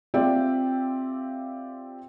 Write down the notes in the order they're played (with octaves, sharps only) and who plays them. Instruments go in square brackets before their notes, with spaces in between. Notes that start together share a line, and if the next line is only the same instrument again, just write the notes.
[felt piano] C4 F4 G4 D5 E5 G5